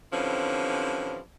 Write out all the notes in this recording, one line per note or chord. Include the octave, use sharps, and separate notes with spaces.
D3 E3 F3 G3 C4 C#4